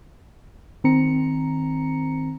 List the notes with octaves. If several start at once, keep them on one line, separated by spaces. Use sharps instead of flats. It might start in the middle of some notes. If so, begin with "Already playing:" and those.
D#3 C4 A#5 C#7